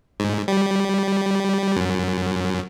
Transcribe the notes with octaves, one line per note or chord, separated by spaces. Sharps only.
G#2
G3
F#2